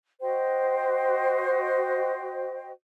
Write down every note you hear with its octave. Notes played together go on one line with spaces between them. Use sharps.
F#4 C5 D#5 G5